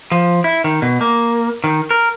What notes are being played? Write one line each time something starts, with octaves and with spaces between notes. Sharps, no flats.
F3
E4
D#3
B2
A#3
D#3
A#4